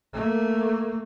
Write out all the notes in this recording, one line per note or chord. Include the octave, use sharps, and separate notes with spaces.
A3 A#3